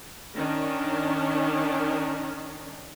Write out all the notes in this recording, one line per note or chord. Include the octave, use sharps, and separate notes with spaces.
D#3 C#4 D4